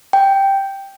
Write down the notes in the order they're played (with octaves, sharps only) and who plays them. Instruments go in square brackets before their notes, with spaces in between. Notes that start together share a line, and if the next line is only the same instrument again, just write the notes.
[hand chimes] G5